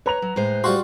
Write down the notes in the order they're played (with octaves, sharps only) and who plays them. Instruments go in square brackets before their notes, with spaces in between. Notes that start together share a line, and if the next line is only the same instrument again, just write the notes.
[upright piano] B4 A#5 F7 [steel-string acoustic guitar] C#5
[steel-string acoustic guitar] F#3
A2 G#3 C5
[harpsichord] G3 F4 F#4 [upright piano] C6